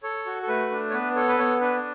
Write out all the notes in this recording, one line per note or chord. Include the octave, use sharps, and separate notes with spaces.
A4 C#5
F#4
A4
A3 B4
D4
C#5
B3 B4
A4 C#5
B4
B3 C#5
D4 B4